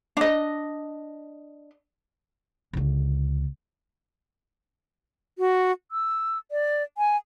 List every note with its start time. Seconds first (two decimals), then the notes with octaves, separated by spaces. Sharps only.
0.17 D4 D#5
2.73 C#2 D3
5.38 F#4
5.91 E6
6.51 D5
6.98 G#5